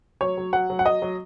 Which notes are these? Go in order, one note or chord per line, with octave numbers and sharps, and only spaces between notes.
F#3 C#5
F#3
F#3 F#5
F#3
F#5
F#3 D#5
F#3